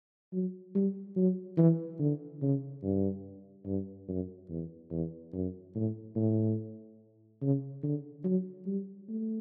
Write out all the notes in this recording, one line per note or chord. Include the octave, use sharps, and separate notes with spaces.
F#3
G3
F#3
E3
D3
C#3
G2
G2
F#2
E2
E2
F#2
A2
A2
C#3
D3
F#3
G3
A3